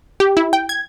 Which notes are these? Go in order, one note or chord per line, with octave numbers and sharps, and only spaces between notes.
G4
E4
G5
G#6